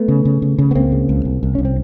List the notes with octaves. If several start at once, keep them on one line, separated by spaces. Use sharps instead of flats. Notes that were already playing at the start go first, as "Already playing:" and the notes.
Already playing: A3 B3
C#3
C#3
C#3
C#3
B3
C#2 A#3 C4
C#3
C#2
C2
C2
C2 C#4
C4